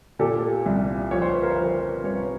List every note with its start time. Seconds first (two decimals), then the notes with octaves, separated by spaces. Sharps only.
0.19 A#2 G4 A4
0.66 C2
1.11 F3 C#5
1.22 C5
1.32 B4
1.42 A#4 C5
1.58 F3
2.04 C2 B4 C#5